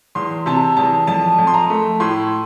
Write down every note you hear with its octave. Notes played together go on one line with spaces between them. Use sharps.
E2 C6
C3 A5
E2 A5
F2 A5
F2
C6
A#5
A3
A2 C6